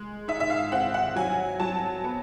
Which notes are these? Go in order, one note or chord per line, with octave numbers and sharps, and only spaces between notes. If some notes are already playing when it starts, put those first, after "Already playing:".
Already playing: G#3
D#4 E5
E5
F5
C4 F#5
F#5
F#3 G#5
F#3 A5
B3